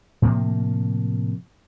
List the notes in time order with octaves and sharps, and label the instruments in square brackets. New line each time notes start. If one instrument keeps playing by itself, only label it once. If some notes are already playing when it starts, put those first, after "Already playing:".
[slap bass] A2 C3 F3 A#3